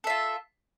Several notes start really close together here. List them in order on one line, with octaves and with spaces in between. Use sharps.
A4 E5 F4